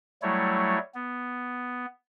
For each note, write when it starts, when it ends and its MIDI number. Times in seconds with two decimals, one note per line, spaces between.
0.22 0.78 54
0.22 0.78 55
0.22 0.78 57
0.22 0.78 64
0.22 0.78 73
0.94 1.86 59